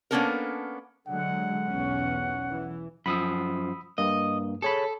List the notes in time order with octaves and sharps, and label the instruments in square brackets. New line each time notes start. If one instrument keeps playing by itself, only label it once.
[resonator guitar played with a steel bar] A#3 B3 C#4 D4 A4 A#4
[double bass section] D3 F#3 G#3 [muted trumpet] F#5
[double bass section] B1 E2 C#4
E3
[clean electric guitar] F#2 F3 [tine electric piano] B5 D#6 E6
[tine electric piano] G2 A#3 [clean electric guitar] D#5
[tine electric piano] G#4 C#5 B5 [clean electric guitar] A4